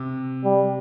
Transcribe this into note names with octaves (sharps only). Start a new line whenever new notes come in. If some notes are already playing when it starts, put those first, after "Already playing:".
Already playing: C3
G3